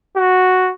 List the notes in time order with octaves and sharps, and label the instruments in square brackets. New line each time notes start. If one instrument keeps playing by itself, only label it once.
[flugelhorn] F#4